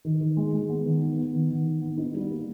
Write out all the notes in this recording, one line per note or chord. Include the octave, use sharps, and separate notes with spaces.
D#3
D#3
G#3
G#3
B3
D#3
B3
B3
D#3
D#3
D#3
B3
D#4
G3
A#3